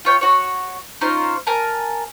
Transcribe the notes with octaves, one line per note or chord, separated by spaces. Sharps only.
F4 C#5 G5
F#4 C#5
C#4 D#4 F4 C5
A#4 G#5 A5